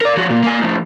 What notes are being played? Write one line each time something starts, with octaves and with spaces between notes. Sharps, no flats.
A#4 D5
F3 F#4
A#2
A#3 G#5
A2 F3